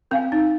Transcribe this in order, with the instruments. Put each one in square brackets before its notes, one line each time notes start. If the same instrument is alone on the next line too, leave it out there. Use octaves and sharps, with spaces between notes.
[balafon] C4 [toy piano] A#4 F5 G#5
[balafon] D#4